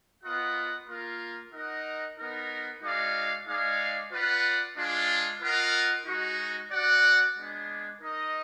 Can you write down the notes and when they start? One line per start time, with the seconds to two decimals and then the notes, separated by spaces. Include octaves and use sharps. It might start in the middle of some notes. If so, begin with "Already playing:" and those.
0.24 B3 F4 A#4 D#5 F#5
0.88 A#3 F4 A#4
1.53 D#4 A#4 D#5 F#5
2.18 B3 D#4 A#4
2.83 G#3 D#4 F#4 D5 F5
3.48 G#3 D#4 G#4 D5 F5
4.12 F4 B4 D5 F#5
4.78 G#3 D4 F4
5.41 F4 A#4 D#5 F#5
6.07 G#3 D#4 F#4
6.71 F#4 D5 F#5
7.36 G#3 B3 D4
8.00 D#4 A#4 D#5